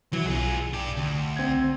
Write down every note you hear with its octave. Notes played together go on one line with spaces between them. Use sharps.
E3 F#3
B1 F4 G#4
D4 G4
D2
C4 G#6